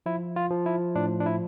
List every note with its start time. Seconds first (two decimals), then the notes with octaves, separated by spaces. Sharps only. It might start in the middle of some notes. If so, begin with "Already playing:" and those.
0.06 F3 E4
0.36 F4
0.51 F3
0.66 E4
0.95 A2 D4
1.20 D4
1.26 E4